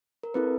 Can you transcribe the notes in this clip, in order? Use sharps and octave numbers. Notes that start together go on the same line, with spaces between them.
A#4
C4 E4 A4 B4